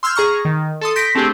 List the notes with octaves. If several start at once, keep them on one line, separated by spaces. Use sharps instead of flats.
C6 E6 F6 G6 G#6
G#4 A#5 C#6 F6
D#3
A4 C6 D#6
C6 G6 A#6 B6 D7
A3 C4 D4 G4 G#4